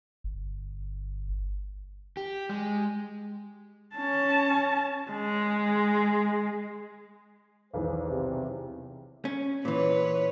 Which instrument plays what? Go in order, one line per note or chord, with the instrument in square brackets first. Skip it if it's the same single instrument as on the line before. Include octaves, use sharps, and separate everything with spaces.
[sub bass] G1
[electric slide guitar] G4
G#3
[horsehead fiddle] C#4 A5
G#3
[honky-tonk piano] B1 E2 D#3 [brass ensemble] B4 C5
[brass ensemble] C3
[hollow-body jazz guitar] C#4
[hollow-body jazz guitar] A#2 E3 [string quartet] B4 C#5